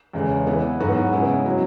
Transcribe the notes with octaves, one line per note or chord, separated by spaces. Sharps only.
E2 C#3 G#3
E3 B3 E4
G#2 F#3 B3 F#4
C#3 G#3 B3 E4
F#3 C#4